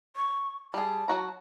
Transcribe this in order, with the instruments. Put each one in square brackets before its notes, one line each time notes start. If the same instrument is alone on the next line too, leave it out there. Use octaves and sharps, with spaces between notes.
[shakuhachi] C#6
[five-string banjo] G3 G#4 [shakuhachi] A5
[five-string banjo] F#3 F#4 A#5